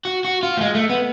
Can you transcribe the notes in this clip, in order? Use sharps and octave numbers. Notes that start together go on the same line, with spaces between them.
F#4
F#4
F4
A3
G#3
A3
B3